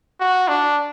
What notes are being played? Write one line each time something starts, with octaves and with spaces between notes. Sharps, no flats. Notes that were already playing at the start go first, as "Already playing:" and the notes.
F#4
D4